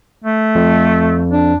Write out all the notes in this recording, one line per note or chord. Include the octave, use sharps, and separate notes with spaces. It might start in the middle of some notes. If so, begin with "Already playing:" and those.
A3
F2
D4